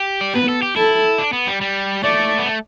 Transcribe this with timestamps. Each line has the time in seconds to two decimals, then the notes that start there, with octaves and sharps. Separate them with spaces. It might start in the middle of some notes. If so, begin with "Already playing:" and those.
Already playing: G4
0.21 D5
0.34 B3 B4
0.49 A4
0.62 G4
0.76 E4 A4
1.19 D4
1.33 B3
1.47 G3
1.61 G3
2.04 A3 D5
2.39 B3
2.46 A3